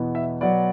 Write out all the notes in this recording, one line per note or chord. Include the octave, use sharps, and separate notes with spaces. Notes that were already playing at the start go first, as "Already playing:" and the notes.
Already playing: E2 B2 B3
E5
B2 F#3 B3 D5